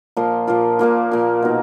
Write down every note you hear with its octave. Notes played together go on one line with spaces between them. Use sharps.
A#2 F3 A#3 F4
A#2 F3 A#3 F4
A#2 F3 A#3 F4
A#2 F3 A#3 F4
B2 A#3 D#4